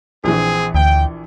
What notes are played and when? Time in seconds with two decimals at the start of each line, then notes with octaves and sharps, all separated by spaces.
0.24 A#1 E3 C4 G#4
0.75 D2 G5